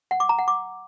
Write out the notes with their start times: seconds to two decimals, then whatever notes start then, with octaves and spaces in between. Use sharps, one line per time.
0.11 F#5
0.20 D6
0.29 A#5
0.38 F#5
0.48 D6